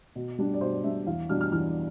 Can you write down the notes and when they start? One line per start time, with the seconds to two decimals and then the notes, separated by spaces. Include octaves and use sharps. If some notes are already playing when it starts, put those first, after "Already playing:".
0.16 B2
0.38 G3 D4
0.54 D5
0.61 B2 C5
0.72 D5
0.84 G3 D4 E5
1.07 E2 F5
1.29 B2 G3 D4 F6
1.41 F6
1.52 E2 F6